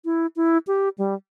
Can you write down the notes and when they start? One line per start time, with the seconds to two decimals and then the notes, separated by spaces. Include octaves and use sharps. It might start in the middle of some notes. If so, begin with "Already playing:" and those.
0.05 E4
0.36 E4
0.67 G4
0.98 G3